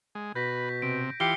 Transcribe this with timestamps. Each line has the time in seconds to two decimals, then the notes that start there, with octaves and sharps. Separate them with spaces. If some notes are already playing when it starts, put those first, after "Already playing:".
0.15 G#3
0.35 B2 B4 G6 A#6 B6
0.69 B6
0.82 C3 D7
1.20 E3 F4 G4 C7 C#7 G7